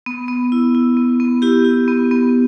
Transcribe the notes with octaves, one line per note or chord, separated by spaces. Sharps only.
B3
B3
E4
E4
B3
B3
E4 G4
E4
B3
B3